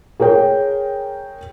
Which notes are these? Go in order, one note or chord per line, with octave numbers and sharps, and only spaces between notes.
G#4 A#4 C#5 G5